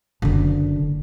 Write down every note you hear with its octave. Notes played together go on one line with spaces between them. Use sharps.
F#1 D3